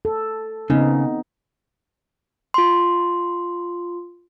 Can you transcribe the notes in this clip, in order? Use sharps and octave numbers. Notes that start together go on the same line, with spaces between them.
A4
C#3 B3 C4 D#4
F4 C6